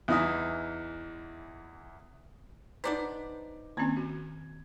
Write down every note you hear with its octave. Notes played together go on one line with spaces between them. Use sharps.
E2 E3 D#4 E5 D#6
B3 D4 D#4 C5 A#5 D6 B6
D#3 A#3 C4 C#4 G#5 G#6
F#4